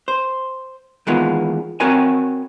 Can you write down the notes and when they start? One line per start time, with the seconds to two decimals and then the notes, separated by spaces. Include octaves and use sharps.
0.08 C5
1.07 D#3 E3 G#3 A#3 B3 F4
1.80 C4 F#4 A#4 C#5 G#5